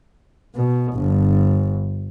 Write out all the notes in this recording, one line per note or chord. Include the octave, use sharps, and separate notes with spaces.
B2
G1